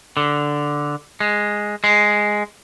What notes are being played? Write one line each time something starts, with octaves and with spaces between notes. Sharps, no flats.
D3
G#3
G#3